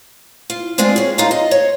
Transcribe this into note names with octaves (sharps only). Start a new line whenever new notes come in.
F4
G#3 C4 D4 F4 G#4
C#4 G#4
D#4 F4 A4 F5 A#5
D#5
C#5